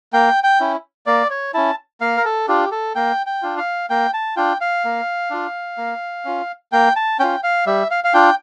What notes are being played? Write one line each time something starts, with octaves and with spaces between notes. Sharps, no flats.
A#3 G5
G5
C#4 E4
A#3 D5
C#5
C#4 E4 A5
A#3 F5
A#4
A4
D4 F4 G4
A4
A#3 G5
G5
D4 F4
F5
A#3 G5
A5
D4 F4 G5
F5
A#3
D4 F4
A#3
C#4 F4
A#3 G5
A5
C#4 F4 G5
F5
G3 E5
F5
F5
D4 F4 G5